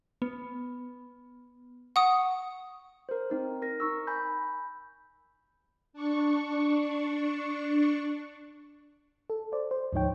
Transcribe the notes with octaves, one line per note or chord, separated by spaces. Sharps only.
B3
F#5 C#6 D#6
A#4 C5
C4 D#4 A#4
A#4 A#6
D#4 C#6 E6
G#5 B5 G6
D4 C#6
A4
C5 D5
C5
D2 G#2 F3 D#4 C#5 G5